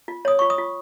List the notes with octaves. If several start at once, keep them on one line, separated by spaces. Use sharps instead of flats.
F4
C#5 D#6
F4 C#6
D#6
F4